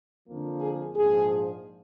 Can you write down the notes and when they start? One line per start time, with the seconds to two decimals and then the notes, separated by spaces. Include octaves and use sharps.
0.27 F2 D3 F3 A#3
0.61 G#4
0.95 A#1 G#2 F3 G#4